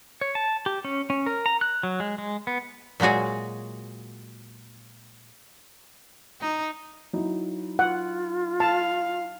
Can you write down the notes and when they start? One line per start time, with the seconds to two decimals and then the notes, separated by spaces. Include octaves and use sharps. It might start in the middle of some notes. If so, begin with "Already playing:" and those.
0.21 C#5
0.35 A5
0.66 G4
0.85 C#4
1.10 C#4
1.26 A#4
1.46 A#5
1.61 F#6
1.83 F#3
2.00 G#3
2.18 G#3
2.47 B3
3.00 A#2 F#3 G#3 F#4 G#4
6.41 D#4
7.13 F#3 D#4 E4
7.79 F4 F#5
8.60 F5 A5